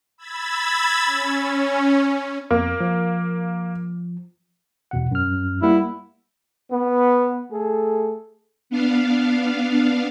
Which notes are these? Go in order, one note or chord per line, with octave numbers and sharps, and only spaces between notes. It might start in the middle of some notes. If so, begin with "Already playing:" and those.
B5 E6 G#6 A6
C#4
F2 A#3
F3
E2 B2 F#5
F#2 F6
G3 A#3 E4 F#5
B3
A3 G#4 A4
B3 D4 F5